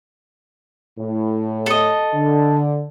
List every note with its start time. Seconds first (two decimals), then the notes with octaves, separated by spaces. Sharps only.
0.99 A2
1.66 A4 D#5
2.14 D3